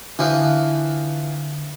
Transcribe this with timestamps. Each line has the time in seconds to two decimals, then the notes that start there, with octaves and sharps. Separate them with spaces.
0.19 D3 E3 F3